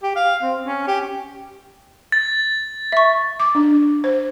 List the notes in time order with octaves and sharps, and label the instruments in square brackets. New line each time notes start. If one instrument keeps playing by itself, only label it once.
[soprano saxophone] G4
F5
C4
C#4
G4
[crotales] A6
[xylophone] E5 C#6
[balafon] D6
D4
C5